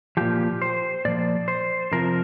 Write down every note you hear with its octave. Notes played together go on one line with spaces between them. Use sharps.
A#2 F3 G4
C5
A#2 F3 D5
C5
F2 C3 F3 A#4